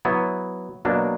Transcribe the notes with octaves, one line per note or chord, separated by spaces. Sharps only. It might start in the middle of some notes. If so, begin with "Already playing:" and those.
F#3 B3 E4
B2 F#3 A#3 D4